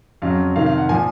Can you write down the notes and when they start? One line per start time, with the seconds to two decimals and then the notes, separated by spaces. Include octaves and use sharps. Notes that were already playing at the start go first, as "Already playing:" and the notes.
0.22 F2 C#3 F#3 F5
0.56 F2 C3 D#3 F5
0.66 F5
0.78 F#5
0.89 A#2 F3 G#5